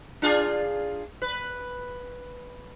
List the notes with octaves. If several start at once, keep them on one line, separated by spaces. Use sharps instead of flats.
D4 F4 G#4
B4